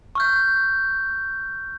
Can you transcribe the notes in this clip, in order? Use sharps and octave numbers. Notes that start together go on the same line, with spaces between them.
C#6 F6 G6